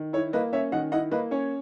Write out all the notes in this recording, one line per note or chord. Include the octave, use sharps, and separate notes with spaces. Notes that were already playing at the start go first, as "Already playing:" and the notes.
Already playing: D#3
E4 C#5
A#3 B4 D#5
C#4 C#5 E5
D#3 D#5 F#5
E4 D#5 F#5
A#3 B4 D#5
C#4 C#5